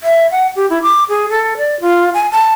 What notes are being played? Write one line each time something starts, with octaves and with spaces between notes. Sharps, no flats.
E5
F#5
G4
E4
D6
G#4
A4
D5
F4
G#5
A5